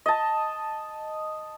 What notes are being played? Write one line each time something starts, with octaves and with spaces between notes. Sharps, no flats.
D#5 A5